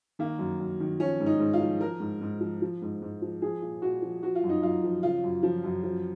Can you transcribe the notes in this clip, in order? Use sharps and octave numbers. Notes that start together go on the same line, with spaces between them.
D#3 A#3
F#2
F#2
D#3
F3 C#4
G#2
D#4
G#2
F4
F3
F3 A#4
G#2
G#2
F3
F3
G#2
G#2
F3
F3 G#4
A#2
A#2 F#4
F3
F3 F#4
F4
F#2
D#4
F#2 F4
F3
C#3 F4
F#2
F3
F#2
F3